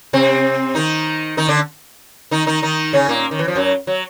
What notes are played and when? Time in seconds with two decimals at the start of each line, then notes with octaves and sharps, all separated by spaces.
0.13 C3 C4
0.75 D#3 D#4
1.37 D#3 D#4
1.48 D3 D4
2.31 D#3 D#4
2.47 D#3 D#4
2.62 D#3 D#4
2.93 C#3 C#4
3.09 A#2 A#3
3.31 D#3
3.39 E3
3.48 F3
3.56 F#2 F#3
3.87 F#3